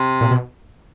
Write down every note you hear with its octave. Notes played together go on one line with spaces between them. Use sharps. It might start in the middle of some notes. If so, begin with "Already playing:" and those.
Already playing: C3
A#2
B2